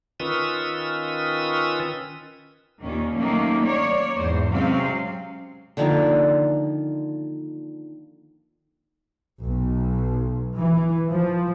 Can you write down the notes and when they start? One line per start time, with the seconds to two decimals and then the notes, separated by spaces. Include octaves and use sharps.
0.20 D#3 C#4 F4 B4 D#6 E6
2.83 D#2 A#2 D#3 C#4
3.16 D#3 F#3 A3 A#3 C#4
3.64 A#3 C#5 D5
4.19 E2 G#2 C5
4.51 C3 F#3 G#3 C4 C#4 F5
5.77 D3 D#3 F3 A#3
9.42 B1
10.58 E3
11.10 F3